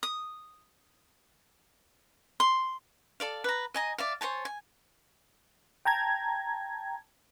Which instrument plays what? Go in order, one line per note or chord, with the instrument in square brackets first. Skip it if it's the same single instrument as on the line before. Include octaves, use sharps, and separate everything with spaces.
[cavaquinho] D#6
C6
A4 D5 F5
B4 A#5
D#5 G#5 A#5
D5 E5 F5
C5 C#5 G#5 A5
G#5
[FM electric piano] G5 A5 A#5 G#6